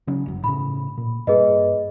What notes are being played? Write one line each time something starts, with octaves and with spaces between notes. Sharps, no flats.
C#3 F#3 C#4
G1 F#2
A2 C#3 B5
A#2
G2 A#3 G#4 B4 D#5